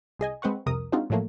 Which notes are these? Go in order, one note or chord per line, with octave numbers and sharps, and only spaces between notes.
C2 G#4 D#5 G#5
G#3 C4 B4 F#5 C#6
C2 F2 C3 A#4 D#6
G#3 C4 D4 D#4 F4 F#4
A2 F3 F#3 A3 A#3